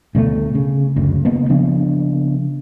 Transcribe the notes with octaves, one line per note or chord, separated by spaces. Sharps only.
D2 B2 G#3 A3
C#3
F#1 D2
C#3 A#3 B3
C#3 F3 B3 D4